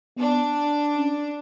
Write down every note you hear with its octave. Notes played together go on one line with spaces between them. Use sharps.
B3 D4
C#4